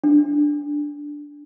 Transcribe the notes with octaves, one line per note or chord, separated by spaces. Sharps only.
D4